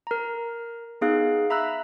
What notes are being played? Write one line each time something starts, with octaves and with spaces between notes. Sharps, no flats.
A#4 A#5
B3 D#4 G#4 F5 F#6
E5 A#5 B5 E6 F#6